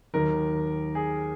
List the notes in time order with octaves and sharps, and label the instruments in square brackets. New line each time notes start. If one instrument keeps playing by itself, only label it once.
[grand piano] D#2 D#3 F#3 A#4
G#4